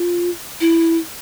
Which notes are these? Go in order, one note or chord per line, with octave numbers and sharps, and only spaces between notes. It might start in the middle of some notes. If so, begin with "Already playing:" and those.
Already playing: F4
E4